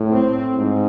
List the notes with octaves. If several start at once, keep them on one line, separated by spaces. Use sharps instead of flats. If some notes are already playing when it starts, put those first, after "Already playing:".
Already playing: A2
C4
G#2